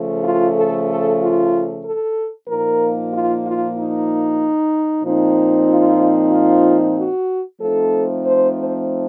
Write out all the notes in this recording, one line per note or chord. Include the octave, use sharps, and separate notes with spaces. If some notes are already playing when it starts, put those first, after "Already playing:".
Already playing: C#3 F3 A3
F4
A4
A4
F4
A4
A#2 F3 A#3 D#4 A#4
F4
F4
D#4
A#2 F3 C4 D#4
F4
F4
F#4
F3 A3 C4 D#4 A4
C5
C5